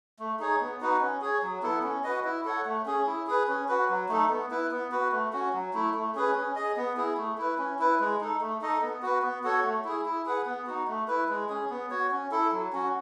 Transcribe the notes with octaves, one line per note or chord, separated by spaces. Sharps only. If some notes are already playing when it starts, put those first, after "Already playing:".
A3
D#4 G#4 C#5
B3
D#4 F#4 B4
C#4
G#4 C#5
F#3
B3 E4 A4
C#4
F#4 B4 D#5
E4
A4 C#5 F#5
A3
C#4 G#4
E4
G#4 B4
C#4
F#4 B4
F#3
A3 D#4 A4
B3
E4 B4
B3
F#4 B4
A3
C#4 F#4
F#3
A3 E4
A3
C#4 G#4 B4
C#4
G#4 D#5
B3
E4 G#4
A3
E4 B4
C#4
E4 B4
G#3
D#4 A4
A3
D#4 A4 D#5
B3
F#4 B4
B3
F#4 A4 C#5
A3
E4 G#4
E4
G#4 B4 F#5
B3
D#4 F#4
A3
E4 B4
G#3
C#4 G#4
B3
F#4 C#5
C#4
E4 A4
F#3
C#4 F#4